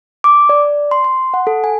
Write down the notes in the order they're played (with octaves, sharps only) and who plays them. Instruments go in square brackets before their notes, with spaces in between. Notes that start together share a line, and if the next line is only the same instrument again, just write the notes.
[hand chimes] D6
D5
C6
C6
F#5
A4
G#5